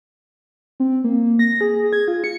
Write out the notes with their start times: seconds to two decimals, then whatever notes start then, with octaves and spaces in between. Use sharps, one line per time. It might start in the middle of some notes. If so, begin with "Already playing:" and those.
0.80 C4
1.04 A#3
1.39 A#6
1.61 G#4
1.93 G#6
2.08 F4
2.24 C#7